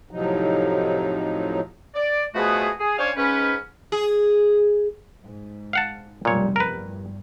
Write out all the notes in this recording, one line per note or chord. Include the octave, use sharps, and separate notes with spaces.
A2 C3 F3 F#3 D#4
D5
B2 F3 A3 B3 F#4 G#4
G#4
C#4 D4 C5 C#5 F5 G#5
G#2 C#4 B4
G#4
G#2
F5 F#5 A5
F1 B1 A#2 G3 C#5
E2 G2 A#4 B4